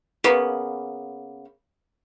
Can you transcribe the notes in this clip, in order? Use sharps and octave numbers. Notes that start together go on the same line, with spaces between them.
C#3 A#3 B3